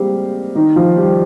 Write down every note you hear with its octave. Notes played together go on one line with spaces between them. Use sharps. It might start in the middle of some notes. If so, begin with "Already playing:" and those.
Already playing: G3 G#3 A#3 C4 G4 C5
D#3 D#4
F3 F4
G3 G4